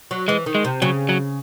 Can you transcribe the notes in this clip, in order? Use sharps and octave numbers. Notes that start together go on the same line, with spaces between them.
F#3
E3 G#3
D#3
G#3
C3
C#3 F#3
F#3